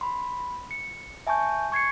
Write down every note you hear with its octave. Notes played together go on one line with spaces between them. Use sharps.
B5 C6
C#7
E5 G#5 A5 C#6 G6
C#6 G#6 C7 C#7